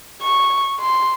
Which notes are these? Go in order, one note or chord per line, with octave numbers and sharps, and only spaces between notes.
C#6
C6